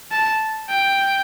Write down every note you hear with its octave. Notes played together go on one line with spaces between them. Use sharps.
A5
G5